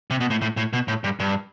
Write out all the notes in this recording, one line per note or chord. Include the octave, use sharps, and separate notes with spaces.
C3
B2
A2
A2
A2
B2
A2
G2
G2